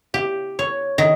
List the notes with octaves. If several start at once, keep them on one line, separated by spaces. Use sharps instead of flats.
G4
C#5
D#3